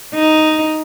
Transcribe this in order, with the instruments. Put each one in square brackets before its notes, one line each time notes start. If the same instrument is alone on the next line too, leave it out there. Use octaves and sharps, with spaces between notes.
[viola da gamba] D#4